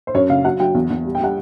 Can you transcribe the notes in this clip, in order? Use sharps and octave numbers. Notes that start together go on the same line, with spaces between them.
C5
F#2 C#5
C#3 F5
F#3 F#5
F#3 G5
E2
E2
G3
G5
G3 F#5